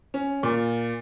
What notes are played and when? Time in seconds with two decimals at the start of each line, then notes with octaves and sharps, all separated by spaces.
0.14 C#4
0.43 A#2